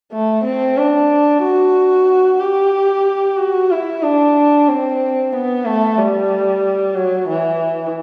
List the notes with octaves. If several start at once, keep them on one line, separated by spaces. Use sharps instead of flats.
A3
C4
D4
F#4
G4
F#4
E4
D4
C4
B3
A3
G3
F#3
E3